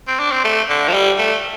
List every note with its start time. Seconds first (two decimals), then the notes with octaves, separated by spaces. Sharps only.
0.07 C4
0.19 D4
0.32 C4
0.44 A3
0.69 D3
0.88 F3
0.93 G3
1.18 A3